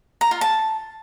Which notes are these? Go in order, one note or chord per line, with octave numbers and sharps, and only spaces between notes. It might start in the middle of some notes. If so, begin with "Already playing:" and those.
A#5
F4
A5